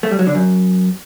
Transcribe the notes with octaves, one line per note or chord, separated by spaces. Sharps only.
A3
G3
F#3
D3
F#2